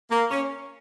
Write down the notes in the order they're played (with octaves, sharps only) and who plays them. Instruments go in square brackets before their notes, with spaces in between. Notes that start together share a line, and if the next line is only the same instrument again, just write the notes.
[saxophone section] A#3
C#4